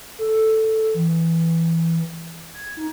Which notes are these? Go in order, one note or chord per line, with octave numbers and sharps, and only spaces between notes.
A4
E3
G#6
D#4